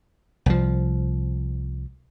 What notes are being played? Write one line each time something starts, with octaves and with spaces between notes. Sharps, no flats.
C2 F3